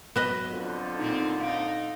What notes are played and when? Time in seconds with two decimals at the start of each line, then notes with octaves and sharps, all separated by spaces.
0.16 F#3 B3 B4 D#5
0.51 F2 D3 F4
0.99 A#2 C4 D#4
1.41 D#4 F5 D7